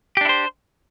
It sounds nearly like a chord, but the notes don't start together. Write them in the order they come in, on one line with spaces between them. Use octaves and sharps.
G4 D4 E4 C5